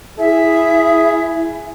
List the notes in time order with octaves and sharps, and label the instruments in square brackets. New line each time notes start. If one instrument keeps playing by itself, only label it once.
[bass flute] E4 [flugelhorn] G#4 [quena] E5